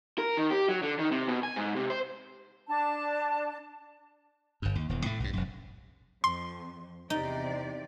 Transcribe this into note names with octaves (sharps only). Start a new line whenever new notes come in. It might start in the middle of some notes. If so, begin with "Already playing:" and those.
A#4
D#3
G4
F#3
D3
D#3
C3
B2
G#5
G#2
C3
C5
D4 A5
G1 G2
D#2
D#1 E2
A2 A3
B1 G2
E1 F#2
F2 C6
E2 C3 D#4 D5